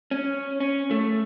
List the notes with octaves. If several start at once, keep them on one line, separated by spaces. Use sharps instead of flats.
C#4
C#4
A3